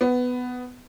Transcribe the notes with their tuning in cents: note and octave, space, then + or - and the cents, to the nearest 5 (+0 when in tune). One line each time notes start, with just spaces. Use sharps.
B3 +10